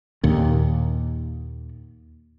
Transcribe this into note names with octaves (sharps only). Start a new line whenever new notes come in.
D#2 A#2